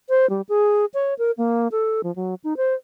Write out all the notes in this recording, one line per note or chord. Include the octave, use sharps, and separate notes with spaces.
C5
G3
G#4
C#5
A#4
A#3
A4
F3
F#3
D#4
C5